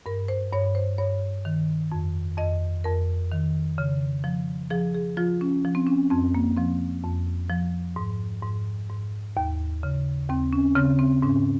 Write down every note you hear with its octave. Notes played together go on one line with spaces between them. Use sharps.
G2 A#4
C5
G2 C#5
C5
G2 C#5
D#3
F2
F2 D#5
F2 A#4
D#3
C#3
F3
F3 G#4
G#4
F3 F4
C#4
F3
C4
C#4
F2 C4
A#3
F3 C4
F2
F3
G#2
G#2
G#2
D#2
C#3
D#2 C4
C#4
C#3 C4
C4
G#2 C#4